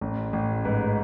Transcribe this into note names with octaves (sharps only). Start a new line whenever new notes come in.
A1
A1
G#2 B4